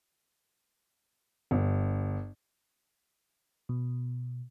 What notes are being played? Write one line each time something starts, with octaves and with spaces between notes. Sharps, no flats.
G1
B2